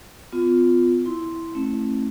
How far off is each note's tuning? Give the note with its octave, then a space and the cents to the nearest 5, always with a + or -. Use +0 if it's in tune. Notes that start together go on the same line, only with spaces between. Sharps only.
B3 +45 F4 +10
E4 +0 C6 -5
A3 -5 C4 +45 E4 -5